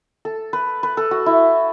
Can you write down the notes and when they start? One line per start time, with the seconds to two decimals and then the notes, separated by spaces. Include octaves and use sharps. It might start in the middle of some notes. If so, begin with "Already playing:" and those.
0.25 A4
0.53 B4
0.83 B4
0.97 A4
1.11 F#4
1.26 E4